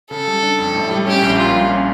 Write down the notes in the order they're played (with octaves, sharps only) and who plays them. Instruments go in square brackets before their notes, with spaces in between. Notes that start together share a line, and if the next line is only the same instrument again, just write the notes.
[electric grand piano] C#3 [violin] A4
[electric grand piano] G3
D4
F2
A2
G3
[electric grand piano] C#4 [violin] G4
[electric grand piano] A#1
[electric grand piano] A#2 [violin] F4
[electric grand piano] G3
C#4